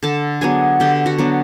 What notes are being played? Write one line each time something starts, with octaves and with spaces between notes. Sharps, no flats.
D3 A4 A5
F#3 B3 D4 G#4 G#5
D3 G4 G5
F#4 F#5
F#3 B3 D4